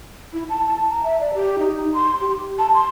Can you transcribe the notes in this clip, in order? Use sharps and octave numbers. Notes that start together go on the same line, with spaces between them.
E4
A5
A5
A#5
E5
D5
G4
D#4
C6
G4
A5
C6